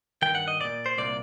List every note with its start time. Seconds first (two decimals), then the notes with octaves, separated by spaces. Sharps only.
0.22 G2 D#3 G5
0.35 F#5
0.48 D#5
0.60 C2 A#2 D5
0.86 C5
0.98 C2 A#2 D5